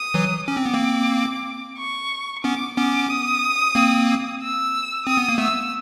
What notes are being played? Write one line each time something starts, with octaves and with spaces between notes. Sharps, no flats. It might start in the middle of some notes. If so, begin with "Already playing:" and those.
Already playing: D#6
E3 F#3
C#4 D6
C4
B3
A#3 C4
C#6
B3 C#4 D6
B3 C#4 D6
D#6
A#3 C4
E6
C4 D#6
B3
A#3
A3 B3 E6